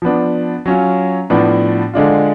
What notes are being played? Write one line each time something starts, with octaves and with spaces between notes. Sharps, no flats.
F3 B3 D4
F#3 C#4 F4
A2 F3 B3 D4
D3 G#3 D4 F4